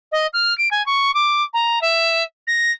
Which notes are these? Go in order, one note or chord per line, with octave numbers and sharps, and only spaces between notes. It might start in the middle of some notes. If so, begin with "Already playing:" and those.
D#5
F6
D7
G#5
C#6
D6
A#5
E5
A#6